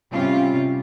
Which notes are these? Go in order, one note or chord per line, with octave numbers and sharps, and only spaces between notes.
C3 G3 C#4 F4